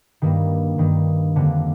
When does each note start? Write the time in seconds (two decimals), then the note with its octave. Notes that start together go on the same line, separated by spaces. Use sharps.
0.22 G2 D#3 G3 A#3
0.78 G2 D#3 G3 A#3
1.36 F2 D3 G3 A#3 D4